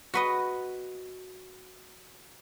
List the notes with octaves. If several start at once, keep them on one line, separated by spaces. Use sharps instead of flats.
F#4 B4 D#5